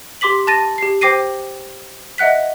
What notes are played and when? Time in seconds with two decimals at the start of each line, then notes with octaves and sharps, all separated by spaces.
0.21 G4 C6 D6 B6 F#7
0.47 A5 A6 A#6 D#7
0.78 G4 C7
1.01 C5 G5 D6 A#6 C7 D#7
2.18 D#5 E5 F#5 F#6 B6